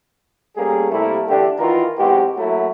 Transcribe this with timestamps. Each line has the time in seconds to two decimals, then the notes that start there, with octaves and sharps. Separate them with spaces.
0.56 G3 A3 A#3 C#4 G#4
0.91 C3 G3 A3 A#3 E4
1.28 E2 D3 A3 D4 G4
1.58 D#3 E3 F4 F#4 A#4
1.98 B1 E2 G#3 C4 F#4 G4
2.36 F#3 A3 A#3 E4 F#4